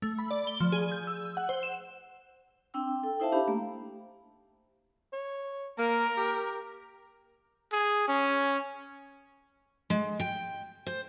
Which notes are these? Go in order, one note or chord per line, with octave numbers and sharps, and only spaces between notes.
A3
B5
D5
G7
F3
G#4
G6
E6
F#5
C5
E7
C4 D4 G5 E6
A4 G5
D#4 E4 C5 E5 F5 A5
D4 G4 F5 B5
A3 A#3
C#5
A#3 A#4
G4
G#4
C#4
G#3
G5
C5